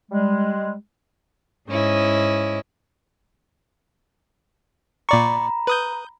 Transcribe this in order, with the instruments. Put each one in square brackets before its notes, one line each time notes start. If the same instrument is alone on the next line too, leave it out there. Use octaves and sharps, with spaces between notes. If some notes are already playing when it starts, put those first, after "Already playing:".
[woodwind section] G3 G#3
[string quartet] G#2 C#4 E4 D#5
[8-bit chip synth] A#2 D5 C#6 [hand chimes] A#5 B5
[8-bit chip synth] B4 D#6 G6